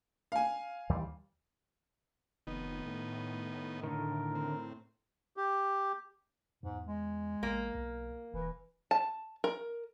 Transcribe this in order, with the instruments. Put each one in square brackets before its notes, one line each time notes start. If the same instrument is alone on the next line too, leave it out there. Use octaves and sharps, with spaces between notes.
[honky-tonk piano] F5 G#5
[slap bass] D#2 E3 G3
[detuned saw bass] F1 [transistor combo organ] D#3 B3 D#4
[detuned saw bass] A2
[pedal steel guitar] D3 D#3 [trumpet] A#4
[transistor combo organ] C4
[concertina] G4
[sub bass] E2 [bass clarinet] G#2
[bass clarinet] G#3
[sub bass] A1 [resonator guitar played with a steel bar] A#3
[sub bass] B1
[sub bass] E1 [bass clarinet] E3
[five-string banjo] A5
A#4